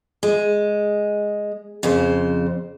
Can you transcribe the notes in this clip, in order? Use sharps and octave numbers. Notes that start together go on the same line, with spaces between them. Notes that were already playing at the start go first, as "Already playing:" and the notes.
G#3
F2 C#3 C5